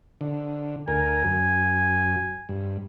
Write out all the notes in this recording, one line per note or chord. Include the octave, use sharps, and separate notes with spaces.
D3
D2 A#4 G#5
F#2
G2